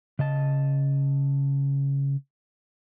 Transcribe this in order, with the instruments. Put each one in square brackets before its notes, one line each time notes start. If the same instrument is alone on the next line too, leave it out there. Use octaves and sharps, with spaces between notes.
[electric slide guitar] C#3 D#5 A5